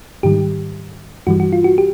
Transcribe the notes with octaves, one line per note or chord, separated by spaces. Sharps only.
G#2 D#3 G3 G4
G2 E3 G3 F#4
F#4
F4
F#4
G4